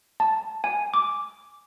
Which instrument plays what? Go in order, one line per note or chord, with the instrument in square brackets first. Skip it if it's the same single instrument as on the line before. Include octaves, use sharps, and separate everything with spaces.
[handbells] A5
G#5
D6